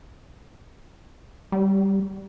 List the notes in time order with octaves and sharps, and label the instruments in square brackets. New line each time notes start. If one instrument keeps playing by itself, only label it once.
[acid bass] G3